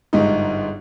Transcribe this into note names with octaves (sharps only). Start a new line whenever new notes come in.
G1 G#2 D#4